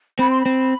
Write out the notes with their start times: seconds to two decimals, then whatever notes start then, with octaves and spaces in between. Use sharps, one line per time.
0.19 C4 B5
0.30 C6
0.40 B5
0.46 C4